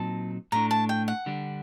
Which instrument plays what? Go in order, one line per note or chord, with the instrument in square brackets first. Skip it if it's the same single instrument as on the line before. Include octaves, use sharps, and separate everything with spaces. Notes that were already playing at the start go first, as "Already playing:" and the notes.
Already playing: [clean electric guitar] A#2 F#3 C4 D#4 [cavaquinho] A5
[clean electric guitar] A2 A3 D4 [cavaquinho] A#5
[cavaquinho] A5
G5
F#5
[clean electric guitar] D3 G3 D4